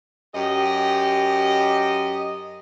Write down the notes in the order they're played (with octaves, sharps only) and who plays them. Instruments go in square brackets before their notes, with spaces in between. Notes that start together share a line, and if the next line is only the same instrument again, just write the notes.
[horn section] F#2 G4 D#5